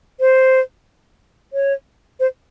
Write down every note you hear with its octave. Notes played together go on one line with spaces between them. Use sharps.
C5
C#5
C5